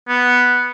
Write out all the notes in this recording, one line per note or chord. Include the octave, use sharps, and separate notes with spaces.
B3